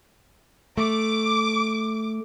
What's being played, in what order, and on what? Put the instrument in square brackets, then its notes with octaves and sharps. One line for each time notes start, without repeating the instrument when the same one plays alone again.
[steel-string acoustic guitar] A3 [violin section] D6